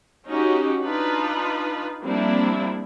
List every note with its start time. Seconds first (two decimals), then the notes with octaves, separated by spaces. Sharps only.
0.27 C#4 D#4 F#4 G4
0.82 D4 D#4 F4 B4
2.02 F3 G3 A#3 C4 D4 E4